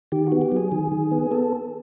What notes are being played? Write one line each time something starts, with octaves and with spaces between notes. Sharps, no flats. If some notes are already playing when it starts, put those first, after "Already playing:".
D#3 G4
B3 F#4
G4
F#3 G#4
D#3
D#3
B3
B3 A4